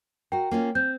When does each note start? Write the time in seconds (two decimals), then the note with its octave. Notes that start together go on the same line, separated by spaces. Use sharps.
0.32 F#4 A#4 G5
0.51 A#3 C#4 F4
0.75 C4 G6